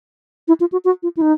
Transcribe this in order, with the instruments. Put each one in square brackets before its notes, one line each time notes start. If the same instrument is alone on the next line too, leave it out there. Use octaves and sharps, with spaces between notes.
[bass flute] E4
F4
F#4
F#4
F4
E4
D#4